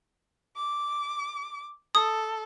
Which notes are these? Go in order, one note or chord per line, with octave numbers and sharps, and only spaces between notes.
D6
A4 D#6